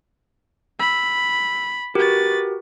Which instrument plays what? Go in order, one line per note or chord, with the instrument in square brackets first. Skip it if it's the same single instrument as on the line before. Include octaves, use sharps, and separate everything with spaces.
[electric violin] B5 [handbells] E6
[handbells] F#4 G4 A#4 [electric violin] B4 A6